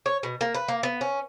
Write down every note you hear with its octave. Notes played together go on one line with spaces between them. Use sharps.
C#5
B2
A#3
B4
A#3
B3
C#4